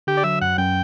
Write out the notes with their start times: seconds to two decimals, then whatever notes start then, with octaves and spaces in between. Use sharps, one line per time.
0.07 D3 G4
0.17 D5
0.24 F#3 E5
0.41 F#2 F#5
0.58 F#2 G5